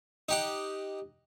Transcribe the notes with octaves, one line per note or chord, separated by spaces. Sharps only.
D#4 G4 F#5